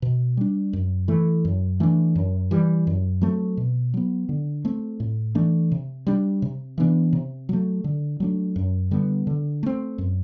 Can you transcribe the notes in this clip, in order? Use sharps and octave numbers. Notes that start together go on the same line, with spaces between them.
B2
G3 D4
F#2
E3 A3
F#2
E3 A3 D4
F#2
E3 G3
F#2
F#3 A3 C4
B2
F#3 B3
D3
A3 C4
A2
E3 A3 D4
C3
G3 D4
C3
E3 B3 D4
C3
F#3 A3
D3
F#3 A3 D4
F#2
D3 G3 B3
D3
A3 C4
F#2